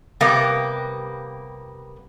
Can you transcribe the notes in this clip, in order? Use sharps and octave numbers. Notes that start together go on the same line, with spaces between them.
C3 G3 A#3 B3